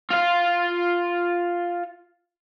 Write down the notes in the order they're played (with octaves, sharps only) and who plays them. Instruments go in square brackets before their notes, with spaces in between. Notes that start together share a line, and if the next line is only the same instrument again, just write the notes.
[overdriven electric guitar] F4 F5